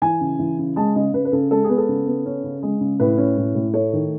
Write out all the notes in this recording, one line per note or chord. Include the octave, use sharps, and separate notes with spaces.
E3 G#5
C#3
E3
C#3
G#3 A5
C#3 D#5
C#3 B4
B4
C#3 A4
G#3 A4
G#4
B3
A4
C#3
B3
C#4
C#3
G#3
C#3
A2 B4
C#4
A2
A2
A3 C#5
D#3